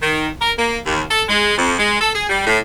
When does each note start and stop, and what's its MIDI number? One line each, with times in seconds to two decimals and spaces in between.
0.03 0.29 51
0.41 0.53 70
0.59 0.80 58
0.86 1.04 39
1.11 1.24 69
1.29 1.58 56
1.58 1.74 41
1.79 2.00 56
2.01 2.13 69
2.15 2.27 68
2.30 2.45 55
2.47 2.60 45